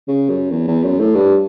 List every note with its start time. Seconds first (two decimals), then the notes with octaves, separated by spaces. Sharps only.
0.08 C#3
0.29 F#2
0.51 E2
0.67 E2
0.84 F#2
0.99 A2
1.15 G2